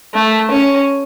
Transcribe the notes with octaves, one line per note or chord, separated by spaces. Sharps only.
A3
C#4